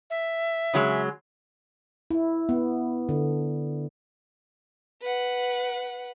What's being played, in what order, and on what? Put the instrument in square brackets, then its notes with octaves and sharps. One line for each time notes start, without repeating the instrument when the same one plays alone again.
[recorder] E5
[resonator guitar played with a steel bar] C#3 F#3 G#3
[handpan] E4
B3
D3
[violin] B4 F#5